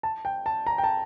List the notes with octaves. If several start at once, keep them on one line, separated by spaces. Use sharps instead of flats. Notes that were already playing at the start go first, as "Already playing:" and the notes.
A5
G5
A5
A#5
G5
A5